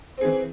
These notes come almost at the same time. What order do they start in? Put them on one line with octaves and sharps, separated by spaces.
C4 G#4 E3